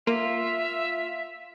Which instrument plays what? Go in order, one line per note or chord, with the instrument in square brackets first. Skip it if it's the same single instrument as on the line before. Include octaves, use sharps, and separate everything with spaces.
[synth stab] A#3 [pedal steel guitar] F4 [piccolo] E5